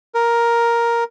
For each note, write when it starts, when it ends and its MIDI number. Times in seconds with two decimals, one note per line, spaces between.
0.15 1.04 70